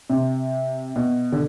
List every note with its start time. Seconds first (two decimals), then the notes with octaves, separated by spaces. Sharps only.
0.10 C3
0.96 B2
1.32 D3